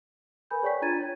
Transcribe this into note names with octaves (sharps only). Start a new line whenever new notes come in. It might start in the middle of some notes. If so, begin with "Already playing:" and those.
A#4 B4 G#5 B5 G6
G#4 C#5 D5 G5 C#6 B6
D4 F4 A#5 G#6 A6 D#7
C#5